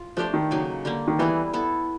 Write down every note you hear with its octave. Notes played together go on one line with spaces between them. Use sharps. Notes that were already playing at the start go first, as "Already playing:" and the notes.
Already playing: F4
F3 A3 D4 G4 C5
D#3
C#3 F#3 A#3 D#4
D3 G3 A#3
D#3
E3 G3 B3 E4 G#4
B3 E4 A4